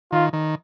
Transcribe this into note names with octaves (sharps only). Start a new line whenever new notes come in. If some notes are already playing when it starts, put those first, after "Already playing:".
D#3 F4
D#3